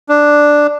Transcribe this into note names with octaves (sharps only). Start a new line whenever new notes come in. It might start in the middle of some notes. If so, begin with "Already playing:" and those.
D4